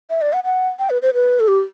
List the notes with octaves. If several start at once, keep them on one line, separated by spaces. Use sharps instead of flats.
E5
D5
F#5
F#5
G5
B4
C5
B4
A4
G4